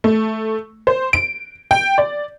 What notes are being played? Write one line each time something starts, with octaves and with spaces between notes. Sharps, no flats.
A3
C5
D7
G5
D5